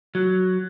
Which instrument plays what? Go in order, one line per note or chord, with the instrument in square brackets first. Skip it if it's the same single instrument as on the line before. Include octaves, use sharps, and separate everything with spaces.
[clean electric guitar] F#3